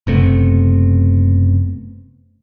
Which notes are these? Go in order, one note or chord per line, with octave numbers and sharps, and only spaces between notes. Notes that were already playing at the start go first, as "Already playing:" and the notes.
F#1 C3 A3 B3